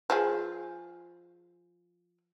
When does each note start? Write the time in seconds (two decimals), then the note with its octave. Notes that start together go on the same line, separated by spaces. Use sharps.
0.10 F3 G#4